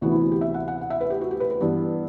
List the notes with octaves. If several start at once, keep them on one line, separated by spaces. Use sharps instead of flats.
D2 C3 E3 B3 F#4
E4
F#4
G4
E5
F#5
F#5
F#5
E5
B4
G4
F#4
G4
B4
B4
G2 E3 G3 B3